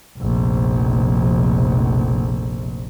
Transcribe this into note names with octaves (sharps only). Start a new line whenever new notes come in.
F1 A#1